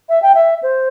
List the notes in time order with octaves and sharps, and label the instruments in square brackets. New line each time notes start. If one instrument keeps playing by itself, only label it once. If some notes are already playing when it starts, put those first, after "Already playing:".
[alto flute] E5
G5
E5
C5